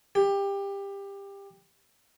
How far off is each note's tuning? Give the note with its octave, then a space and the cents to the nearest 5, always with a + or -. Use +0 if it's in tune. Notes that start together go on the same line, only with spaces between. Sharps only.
G4 +20